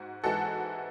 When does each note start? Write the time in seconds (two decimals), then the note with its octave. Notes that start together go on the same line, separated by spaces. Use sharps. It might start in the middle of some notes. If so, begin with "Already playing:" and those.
Already playing: G#2 F#4
0.24 G#2 E3 G#3 F#4 A4